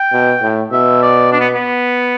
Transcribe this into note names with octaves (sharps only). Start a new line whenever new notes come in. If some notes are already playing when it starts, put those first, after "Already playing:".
Already playing: G5
B2
A2
B2 E5
D5
D4
B3
B3